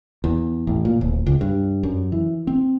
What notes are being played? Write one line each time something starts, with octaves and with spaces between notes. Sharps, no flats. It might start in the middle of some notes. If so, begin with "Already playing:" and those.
E2
A1
A#2
D1
C#2
G2
F#2
E3
C4